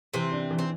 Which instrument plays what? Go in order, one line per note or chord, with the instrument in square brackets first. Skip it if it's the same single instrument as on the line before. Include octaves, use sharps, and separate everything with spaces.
[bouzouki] C3 C4 [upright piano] E3
[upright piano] D4
E3
[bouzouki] C4